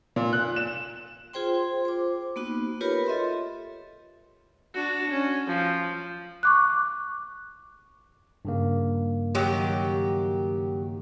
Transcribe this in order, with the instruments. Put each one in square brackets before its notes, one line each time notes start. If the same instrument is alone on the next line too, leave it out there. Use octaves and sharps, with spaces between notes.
[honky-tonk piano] A#2
F#6
E7
[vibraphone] F4 G#4 C5 G5 C6
C5 D6
A#3 B3 D#4 F#4
F4 G4 A#4 B4 C#5 B5
A4 D#5 E5 C6
[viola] D4 F#4
C#4
F3
[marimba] C#6 D6 F#6
[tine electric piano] G2 C#3 A#3
[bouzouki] D#3 F#3 G4